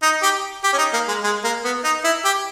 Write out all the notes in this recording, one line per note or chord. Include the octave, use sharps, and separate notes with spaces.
D#4
G4
G4
C#4
D#4
A#3
G#3
G#3
A#3
B3
D#4
E4
G4